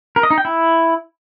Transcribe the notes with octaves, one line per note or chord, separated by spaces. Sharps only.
A#4
D#5
D#4
G5
E4